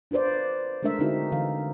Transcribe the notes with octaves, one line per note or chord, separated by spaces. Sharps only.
D4 F4 B4 C5 D5
G#3 A3 D4 A#4 E5
D3 G#3 C4 D#4 E4 F#4
D3 E3 F5